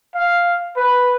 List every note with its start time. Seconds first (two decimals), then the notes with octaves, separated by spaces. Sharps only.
0.14 F5
0.76 B4